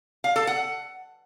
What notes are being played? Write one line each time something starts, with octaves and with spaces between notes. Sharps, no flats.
F5
A4
F#5